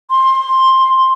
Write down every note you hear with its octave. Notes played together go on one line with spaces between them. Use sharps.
C6